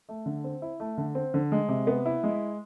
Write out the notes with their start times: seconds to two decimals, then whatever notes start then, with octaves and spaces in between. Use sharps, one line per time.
0.09 A3
0.26 D3
0.44 C4
0.62 E4
0.80 A3
0.98 D3
1.15 C4
1.34 D3
1.52 G#3
1.69 C3
1.87 B3
2.06 E4
2.23 G#3